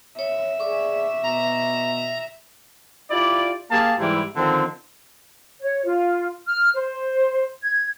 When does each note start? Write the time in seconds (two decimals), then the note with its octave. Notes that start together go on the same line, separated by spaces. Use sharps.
0.19 C#5 E5
0.60 G#4 D5 C#6 D6
1.23 B2 B3 A#5
3.11 E4 F4 G4 D5
3.70 A#3 G4 G#4 F5 A5
3.99 G#2 E3 G3 E4
4.36 D3 D#3 F3 C4
5.61 C#5
5.85 F4
6.47 F6
6.74 C5
7.62 G#6